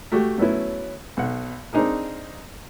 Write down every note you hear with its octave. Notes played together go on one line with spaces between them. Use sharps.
A3 F#4 G4
F#3 A3 B3 C#4 E4
B1 F#5
C4 D4 D#4 G#4 A#4